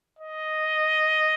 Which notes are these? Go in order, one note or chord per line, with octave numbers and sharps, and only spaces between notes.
D#5